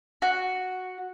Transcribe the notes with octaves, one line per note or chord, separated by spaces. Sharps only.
F#4